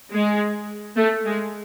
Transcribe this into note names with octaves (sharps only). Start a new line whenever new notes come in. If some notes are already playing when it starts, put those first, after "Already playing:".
G#3
A3
G#3